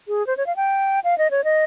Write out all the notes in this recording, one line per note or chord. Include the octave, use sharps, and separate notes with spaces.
G#4
C5
C#5
F5
G5
F5
D#5
C#5
D#5